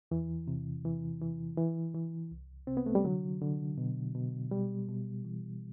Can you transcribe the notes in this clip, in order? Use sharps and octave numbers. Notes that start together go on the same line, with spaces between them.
E2 E3
C3
E3
E3
E3
E3
C2
C3 C4
B3
A3
G3
D3 F#3
D3
B2
B2
B2 G3
B2
E3